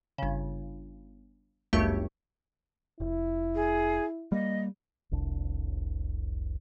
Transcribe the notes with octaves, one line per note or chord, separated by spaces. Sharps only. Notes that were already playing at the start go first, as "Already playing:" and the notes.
G1 C#3
G1 C#2 F#2 A3 G4 C#6
F1 E4
G#4
G3 A#3 D#5
F1 C2 D4